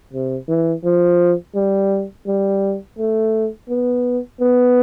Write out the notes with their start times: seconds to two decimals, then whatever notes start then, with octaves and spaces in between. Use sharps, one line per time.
0.13 C3
0.49 E3
0.84 F3
1.55 G3
2.27 G3
2.98 A3
3.69 B3
4.41 B3